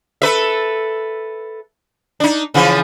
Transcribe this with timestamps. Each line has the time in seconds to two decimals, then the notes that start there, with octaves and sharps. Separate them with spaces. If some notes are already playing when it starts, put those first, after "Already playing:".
0.22 A4 B4 E5
2.20 D4 D#4
2.54 C#3 E3 F3